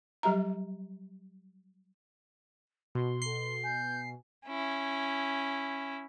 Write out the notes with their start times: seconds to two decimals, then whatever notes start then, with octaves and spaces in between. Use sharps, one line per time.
0.23 F#3 G3 G4 E5 A#5
2.95 B2 F#4 C6
3.22 A4 C7 G7
3.64 G#5 G6
4.47 C#4 E4